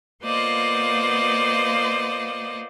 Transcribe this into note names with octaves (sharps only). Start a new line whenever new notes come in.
A#3 B3 F4 C5 D5 D#5